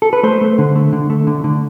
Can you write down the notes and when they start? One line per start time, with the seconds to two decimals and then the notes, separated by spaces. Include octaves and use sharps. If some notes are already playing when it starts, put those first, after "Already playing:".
0.02 A4
0.13 B4
0.23 A3 C5
0.41 A3
0.58 D3
0.75 A3
0.93 D3
1.10 A3
1.27 D3
1.44 D3